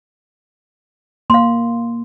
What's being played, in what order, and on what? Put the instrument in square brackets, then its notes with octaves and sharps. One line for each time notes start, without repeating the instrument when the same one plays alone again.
[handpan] A#3 [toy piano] F5 C6